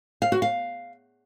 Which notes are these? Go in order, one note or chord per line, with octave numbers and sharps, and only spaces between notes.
F5
F#4
F5